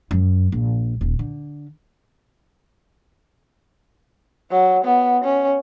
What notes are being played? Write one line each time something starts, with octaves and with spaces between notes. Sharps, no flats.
F#2
A#1
D#1
D3
F#3
B3
C#4